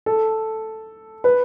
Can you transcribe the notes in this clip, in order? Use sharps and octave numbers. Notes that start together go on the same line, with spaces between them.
A4
B4